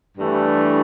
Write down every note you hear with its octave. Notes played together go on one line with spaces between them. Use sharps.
G2 E3 A3